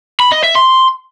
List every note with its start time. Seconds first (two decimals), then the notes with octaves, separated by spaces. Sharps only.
0.20 B5
0.32 D#5
0.44 E5
0.55 C6